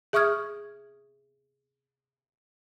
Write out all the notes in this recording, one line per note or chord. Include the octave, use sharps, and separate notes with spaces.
G#4 E5 C#6 D#6 F6 G#6